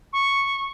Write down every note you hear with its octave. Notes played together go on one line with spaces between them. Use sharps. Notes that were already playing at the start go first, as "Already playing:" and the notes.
C#6